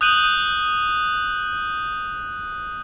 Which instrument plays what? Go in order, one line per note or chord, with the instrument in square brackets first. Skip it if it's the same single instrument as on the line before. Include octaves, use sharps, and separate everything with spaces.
[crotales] D#6 F#6 G6 D#7 F#7